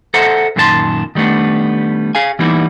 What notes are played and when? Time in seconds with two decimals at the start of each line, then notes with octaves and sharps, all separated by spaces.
0.14 A4 C5 E5 F#5 A5 A#5
0.56 F#2 A#2 D#3 E4 A5 C6
1.15 D#3 G3 A3 B3 D4
2.15 G#4 F5 G#5
2.39 E3 G3 A#3 B3 D#4 E4